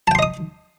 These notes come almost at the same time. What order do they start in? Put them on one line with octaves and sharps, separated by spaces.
A5 G5 C6 D#5 D#6